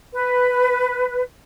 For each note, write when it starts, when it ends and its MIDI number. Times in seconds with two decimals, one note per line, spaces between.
0.13 1.22 71